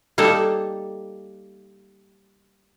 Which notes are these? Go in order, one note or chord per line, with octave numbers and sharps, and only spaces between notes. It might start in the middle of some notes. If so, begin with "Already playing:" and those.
G3 A#3 D#4 A4